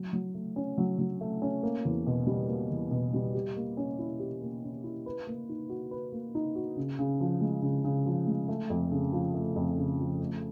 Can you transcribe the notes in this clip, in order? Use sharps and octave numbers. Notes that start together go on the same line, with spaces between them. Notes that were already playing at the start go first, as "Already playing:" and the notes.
Already playing: F#3
F#3
A3
C#4
F#3
F#3
A3
C#4
A#3
E2
B2
G3
A#3
E2
B2
G3
G4
A#3
C#4
E4
G4
A#3
C#4
E4
B4
A#3
D#4
F#4
B4
A#3
D#4
F#4
C#3
C#3
F3
G#3
C#3
C#3
F3
G#3
A3
F2
C#3
F3
A3
F2
C#3
F3
A3